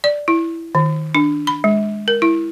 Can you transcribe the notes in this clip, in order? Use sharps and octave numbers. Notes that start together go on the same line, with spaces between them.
D5
E4
D#3
D4
B5
G#3
A#4
E4